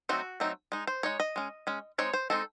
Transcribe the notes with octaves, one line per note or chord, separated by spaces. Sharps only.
F#3 A3 C4 D#4 F#4
F#3 A3 C4 D#4
G#3 D#4
C5
G#3 D#4 C#5
D#5
G#3 C#4
G#3 C#4
G#3 C4 D#4 C#5
C5
G#3 C4 D#4 A4